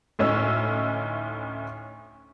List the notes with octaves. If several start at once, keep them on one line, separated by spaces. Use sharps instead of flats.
D2 A2 C#4 D#4 E6